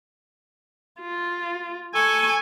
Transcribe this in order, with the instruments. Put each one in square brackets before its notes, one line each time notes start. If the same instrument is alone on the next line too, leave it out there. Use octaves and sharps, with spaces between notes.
[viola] F4
[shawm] A4 [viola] G#5 C#6